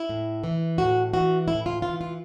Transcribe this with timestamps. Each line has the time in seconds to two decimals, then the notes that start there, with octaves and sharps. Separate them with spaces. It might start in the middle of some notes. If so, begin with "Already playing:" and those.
Already playing: E4
0.09 A2
0.44 E3
0.78 A2 F#4
1.14 E3 F#4
1.48 A2 E4
1.66 F4
1.82 E3 F4
2.01 F4